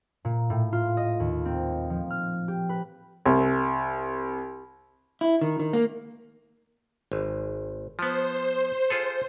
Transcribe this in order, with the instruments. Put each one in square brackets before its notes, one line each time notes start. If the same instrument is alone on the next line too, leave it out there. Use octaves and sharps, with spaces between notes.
[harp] A#2
A2
F4
D#5
D#2
C4
F3
F6
G4
B4
[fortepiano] C2
[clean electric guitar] E4
D#3
D#3
A#3
[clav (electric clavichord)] G#1
[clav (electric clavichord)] F3 B3 [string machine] C5
[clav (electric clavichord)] F4 G#4 A4